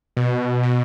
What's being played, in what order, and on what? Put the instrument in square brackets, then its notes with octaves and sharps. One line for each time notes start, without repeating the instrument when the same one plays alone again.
[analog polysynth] B2
B2